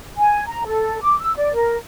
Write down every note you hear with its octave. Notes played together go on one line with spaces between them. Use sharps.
G#5
A#5
A4
D6
E6
D5
A#4